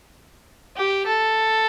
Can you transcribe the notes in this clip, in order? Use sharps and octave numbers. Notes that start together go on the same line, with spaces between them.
G4
A4